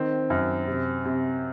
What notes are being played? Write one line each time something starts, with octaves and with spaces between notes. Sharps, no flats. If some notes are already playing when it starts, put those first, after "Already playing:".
Already playing: D#3 C4
F#2
C3
C3